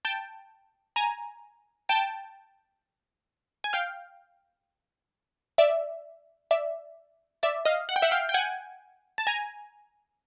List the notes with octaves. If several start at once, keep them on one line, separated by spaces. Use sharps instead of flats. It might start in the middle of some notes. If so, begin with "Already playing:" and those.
G5 A5
G#5 A#5
G5 A5
G#5
F5 G5
D5 E5
D5 E5
D5 E5
D#5 F5
F#5
G5
E5 F#5
F5 G5
G5
F#5 G#5
A5
G#5 A#5